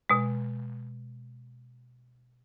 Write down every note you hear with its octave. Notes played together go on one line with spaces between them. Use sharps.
B2 G#3